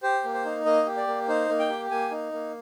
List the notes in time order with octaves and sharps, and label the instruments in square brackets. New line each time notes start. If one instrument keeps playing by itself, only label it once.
[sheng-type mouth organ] G4 C5
A#3
C5
D#4
A#3 D#5
G4
D5
A#3
D#4 C5
A#3
G5
G4
A#3 G#5
D#4
A#3